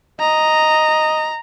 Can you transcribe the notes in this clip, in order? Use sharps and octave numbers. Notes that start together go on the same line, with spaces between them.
D#5 A#5